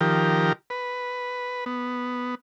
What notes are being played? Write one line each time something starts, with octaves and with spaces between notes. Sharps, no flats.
D#3 F3 G4 A#4
B4
B3